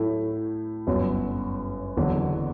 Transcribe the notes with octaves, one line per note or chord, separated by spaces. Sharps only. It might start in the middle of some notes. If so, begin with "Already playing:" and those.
Already playing: A2 F#3 A3 E4
G1 F#2 F#3
F#1 E2 D3 F#3